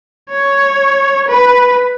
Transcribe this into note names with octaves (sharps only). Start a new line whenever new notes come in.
C#5
B4